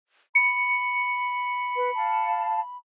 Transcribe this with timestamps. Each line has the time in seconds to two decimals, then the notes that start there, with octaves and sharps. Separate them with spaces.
0.35 B5 C#7
1.76 B4
1.96 F5 A5